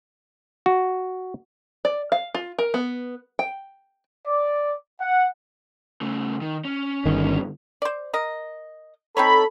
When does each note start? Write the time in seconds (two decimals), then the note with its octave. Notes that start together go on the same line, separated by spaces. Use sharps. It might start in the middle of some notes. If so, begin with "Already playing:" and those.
0.66 F#4
1.85 D5
2.12 F5
2.35 F4
2.59 A#4
2.74 B3
3.39 G5
4.26 D5
5.00 F#5
6.01 C#3 A3
6.41 D#3
6.65 C#4
7.06 G1 D#3
7.82 C5 D5
8.13 A#4 D#5
9.17 C4 D#4 A4 C#5 B5